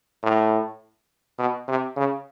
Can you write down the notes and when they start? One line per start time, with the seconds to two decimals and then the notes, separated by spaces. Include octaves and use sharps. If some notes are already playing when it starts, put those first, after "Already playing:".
0.23 A2
1.39 B2
1.68 C3
1.97 C#3